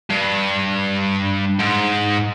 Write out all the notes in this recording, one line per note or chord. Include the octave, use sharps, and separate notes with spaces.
G2
G#2